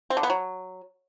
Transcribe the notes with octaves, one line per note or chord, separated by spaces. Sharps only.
C4
D3
B3
F#3